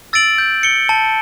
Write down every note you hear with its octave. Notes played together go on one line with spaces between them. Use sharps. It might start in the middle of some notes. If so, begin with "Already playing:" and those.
E6 A6 D7 F#7
G6
C#7 G7
A5